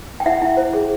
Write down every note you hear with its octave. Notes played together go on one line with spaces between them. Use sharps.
G5
E4 E5 F#5
E4
C5
G#4